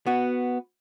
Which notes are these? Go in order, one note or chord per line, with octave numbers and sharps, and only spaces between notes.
B3 F#4